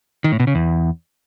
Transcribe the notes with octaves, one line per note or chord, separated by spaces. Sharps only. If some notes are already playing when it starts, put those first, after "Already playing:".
D#3
A2
B2
C#3
E2